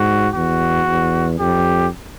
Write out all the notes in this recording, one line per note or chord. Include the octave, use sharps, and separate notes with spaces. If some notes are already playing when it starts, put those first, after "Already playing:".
Already playing: G#2 F#4
E2 F#4
E2
F2 G4